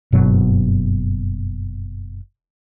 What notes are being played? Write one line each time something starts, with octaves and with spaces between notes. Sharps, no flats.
F#1 G2 B2 F#3